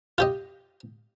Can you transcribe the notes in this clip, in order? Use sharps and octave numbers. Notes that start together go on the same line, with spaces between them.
F4 G4 D#5